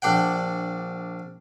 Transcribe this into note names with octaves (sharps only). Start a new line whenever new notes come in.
A#1 D4 F#5 G5